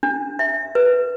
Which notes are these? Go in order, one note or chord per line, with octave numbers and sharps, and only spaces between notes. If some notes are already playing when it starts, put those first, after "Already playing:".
D4
E5
B4